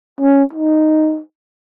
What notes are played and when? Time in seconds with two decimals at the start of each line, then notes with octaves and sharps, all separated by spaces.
0.21 C#4
0.53 D#4